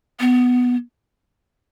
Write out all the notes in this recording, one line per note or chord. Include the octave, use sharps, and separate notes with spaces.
B3